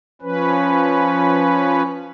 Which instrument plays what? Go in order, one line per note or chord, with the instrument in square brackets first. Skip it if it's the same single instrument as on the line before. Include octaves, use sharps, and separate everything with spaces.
[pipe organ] F3 C#4 B4